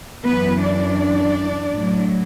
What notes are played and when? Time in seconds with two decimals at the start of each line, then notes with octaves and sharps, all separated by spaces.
0.23 F#2 E3 B3 B4
0.61 D4 D5
1.74 A2 F#3